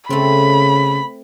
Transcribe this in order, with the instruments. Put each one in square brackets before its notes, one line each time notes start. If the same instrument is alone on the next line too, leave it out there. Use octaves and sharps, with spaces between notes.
[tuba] C#3 [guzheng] A3 C4 [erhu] B5